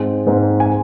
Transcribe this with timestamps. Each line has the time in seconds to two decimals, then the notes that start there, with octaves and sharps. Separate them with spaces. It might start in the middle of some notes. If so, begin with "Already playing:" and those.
Already playing: G#2 G#3 C4
0.27 G#2 G#3 C4
0.60 G#5